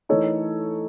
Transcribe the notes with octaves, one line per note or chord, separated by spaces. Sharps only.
E3 A3 D#4 A4 C#5